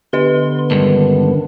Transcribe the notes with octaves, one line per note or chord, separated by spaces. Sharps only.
D3 B3 G4 B4 D#5 C6
C#2 G2 D#3 D4